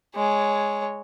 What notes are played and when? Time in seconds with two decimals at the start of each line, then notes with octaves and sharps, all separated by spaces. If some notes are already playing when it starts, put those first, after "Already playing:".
0.15 G#3 C#5